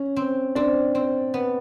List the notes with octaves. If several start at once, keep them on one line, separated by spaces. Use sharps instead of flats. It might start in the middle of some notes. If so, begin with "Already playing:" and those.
Already playing: C#4
C4
C4 D4
C4
B3